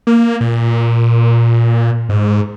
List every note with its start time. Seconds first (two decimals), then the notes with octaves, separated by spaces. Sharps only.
0.07 A#3
0.41 A#2
2.09 G#2